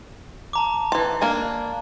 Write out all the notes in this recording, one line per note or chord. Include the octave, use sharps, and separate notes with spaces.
A5 A#5 D6
E3 A5 C6
A#3 D4 G#5